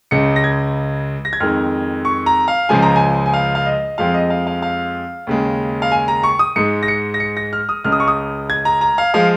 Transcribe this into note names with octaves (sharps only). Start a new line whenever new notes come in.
C#2 C#3 G#3 C#7
A#6
G#6
A#6
G#6
F2 D#3 G#3 F6
C#6
A#5
F5
C#2 C#3 F3 G#3 G#5
A#5
G#5
G#5
F5
F5
D#5
F2 F3 G#3 F5
D#5
F5
F5
F5
D#2 C#3 G#3
F5
G#5
A#5
C#6
D#6
G#2 G#3 C#7
A#6
C#7
A#6
C#7
A#6
F6
D#6
C#2 C#3 G#3 F6
D#6
C#6
D#6
G#6
A#5
A#5
F5
F3 G#3 F5